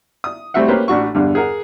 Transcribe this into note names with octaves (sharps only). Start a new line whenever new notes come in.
D#6
G3 A3 C4 F#4 E5 F#5
A#3 C#4 G4 B4 C5
A1 A3 D4 F#4 C#6
E2 G2 D3
G#4 A#4 F#5